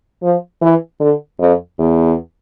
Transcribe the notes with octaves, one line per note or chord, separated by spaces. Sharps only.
F3
E3
D3
F2
E2